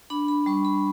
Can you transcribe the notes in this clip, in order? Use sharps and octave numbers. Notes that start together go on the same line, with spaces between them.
D4 B5
B5
G3 C#6
B5